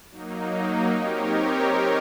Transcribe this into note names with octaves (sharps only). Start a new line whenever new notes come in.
F#3 A#3 D#4
C4 D#4 G4 A#4 C#5